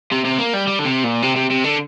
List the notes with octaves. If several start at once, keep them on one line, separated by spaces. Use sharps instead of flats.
C3
C3
A#3
G3
G3
D3
C3
A#2
C3
C3
C3
D3